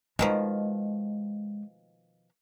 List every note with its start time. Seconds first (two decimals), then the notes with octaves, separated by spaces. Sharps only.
0.19 B2 D#3 F3 G#3